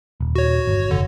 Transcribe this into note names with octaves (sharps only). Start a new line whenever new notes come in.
D#1
F#4 C#5
G1
F1 D3